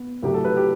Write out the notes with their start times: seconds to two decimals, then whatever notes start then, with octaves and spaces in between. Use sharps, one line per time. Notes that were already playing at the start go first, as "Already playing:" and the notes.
Already playing: B3
0.23 C2 C3 F#3 A3 G4
0.34 A4
0.44 B4
0.56 G4